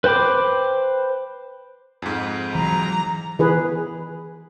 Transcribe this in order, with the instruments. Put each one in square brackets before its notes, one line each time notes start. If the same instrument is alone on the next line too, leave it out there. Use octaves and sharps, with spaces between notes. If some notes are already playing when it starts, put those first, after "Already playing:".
[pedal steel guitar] B4 C5 G5 B5 D6
[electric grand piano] F2 G#2
[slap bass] E3 F#3 [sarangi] A#5
[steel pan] E3 G#4 B4